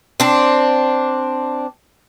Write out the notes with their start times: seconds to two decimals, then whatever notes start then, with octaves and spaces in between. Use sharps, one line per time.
0.20 C4 D4